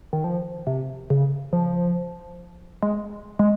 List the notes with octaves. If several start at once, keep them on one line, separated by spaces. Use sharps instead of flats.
D#3
F3
C3
C#3
F3
G#3
G#3